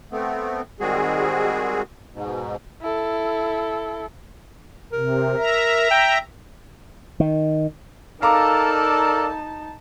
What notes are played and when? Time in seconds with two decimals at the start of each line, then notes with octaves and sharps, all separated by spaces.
0.12 A3 B3 C4
0.80 D#3 G3 G#3 C4 F#4 G#4
2.14 G#2 B2
2.81 E4 A4
4.93 C3 A#4
5.37 E5 A#5
5.91 G5
7.20 D#3
8.22 D#4 A4 A#4 D5 F5 A5 A#5 D6